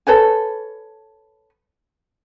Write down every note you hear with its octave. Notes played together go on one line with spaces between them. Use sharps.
A4 B4 C#5 G#5